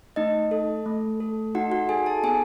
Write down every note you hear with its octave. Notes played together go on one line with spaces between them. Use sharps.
A3 D#4 D#5
A4
A3
A4
D#4 F#4 F#5
F#4 F#5
G#4 A4 G#5
A4 A5
B3 G#4 G#5